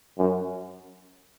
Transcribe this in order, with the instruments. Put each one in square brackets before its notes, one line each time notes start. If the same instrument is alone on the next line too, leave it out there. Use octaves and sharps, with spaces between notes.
[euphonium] F#2